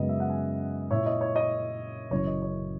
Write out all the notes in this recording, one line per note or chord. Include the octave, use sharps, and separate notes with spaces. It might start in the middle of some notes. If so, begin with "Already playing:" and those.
Already playing: F#2 C#3 G#3 B3 D#5
E5
F#5
E5 G#5
A#2 A#3 E4 C#5 E5
D#5
C#5
D#5
F#1 F#2 C#3 E3 C#5
D#5
C#5